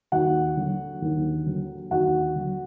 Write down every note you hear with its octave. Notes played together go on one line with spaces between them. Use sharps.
D#2 F#4 F#5
D3 F#3
D#2
D3 F#3
D#2 F#4 F#5
D3 F#3